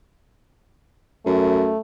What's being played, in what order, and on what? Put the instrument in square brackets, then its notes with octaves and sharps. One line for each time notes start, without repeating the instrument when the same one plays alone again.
[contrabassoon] F#2 [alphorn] A3